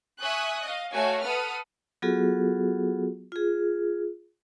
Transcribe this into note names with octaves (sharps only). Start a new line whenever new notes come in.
E5 G#5 C#6 D#6 F#6
D#5 F5
A3 F#4 C#5 F5 G#5
A4 B4 F#5 D#6 F6
F#3 B3 F4 F#4 G#4 A4
F4 G#4